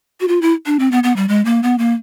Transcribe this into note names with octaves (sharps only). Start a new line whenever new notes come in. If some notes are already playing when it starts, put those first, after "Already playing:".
F#4
F4
E4
D4
C4
B3
B3
G3
G#3
A#3
B3
A#3